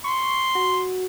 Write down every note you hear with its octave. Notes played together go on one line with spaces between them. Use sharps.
C6 C#6
F#4